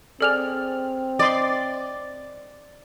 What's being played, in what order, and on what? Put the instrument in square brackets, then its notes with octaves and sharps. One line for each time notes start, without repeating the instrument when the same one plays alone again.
[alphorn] C4 [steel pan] G#4 D5 G#5 [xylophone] A4 F6 F7
[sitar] D5 [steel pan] D#5 C6